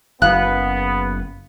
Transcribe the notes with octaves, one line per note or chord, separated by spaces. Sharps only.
F#1 B3 F5 F#6